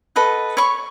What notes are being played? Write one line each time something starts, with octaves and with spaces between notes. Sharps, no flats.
A4 B4 D#5 F#5
C#5 B5 C#6